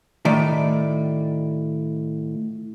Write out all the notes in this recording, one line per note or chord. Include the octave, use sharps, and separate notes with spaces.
A2 D#3 D5